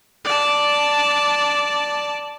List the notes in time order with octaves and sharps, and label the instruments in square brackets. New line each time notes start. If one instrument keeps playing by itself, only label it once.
[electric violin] D5 A5